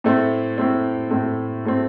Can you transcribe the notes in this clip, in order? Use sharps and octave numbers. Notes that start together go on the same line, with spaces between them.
A2 A3 C4
A2 A3 C4
A2 A3 C4
A2 A3 C4